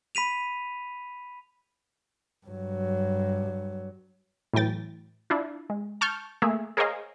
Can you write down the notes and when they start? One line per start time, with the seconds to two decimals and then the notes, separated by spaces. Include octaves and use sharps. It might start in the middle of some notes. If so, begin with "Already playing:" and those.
0.15 B5 B6 D#7 F7
2.47 G2 F#3
4.53 A2 E3 F#3 G5 A6
5.30 D4 E4 F4
5.70 G#3
6.01 A5 C#6 F6 G6
6.42 A3 A#3 G#4 E5
6.77 G#4 A#4 C5 C#5 D#5 F5